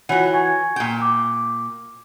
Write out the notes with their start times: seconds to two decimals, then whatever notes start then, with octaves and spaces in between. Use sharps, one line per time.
0.09 E3 F4 F#4 C#5 F#5
0.33 G#5 C#6 G#6
0.76 A#2 G5
1.02 D6